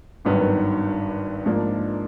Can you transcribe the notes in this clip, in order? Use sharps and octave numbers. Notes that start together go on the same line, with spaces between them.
G#1 G2 D#3 F#3 B3
G#2 F3 A#3 D4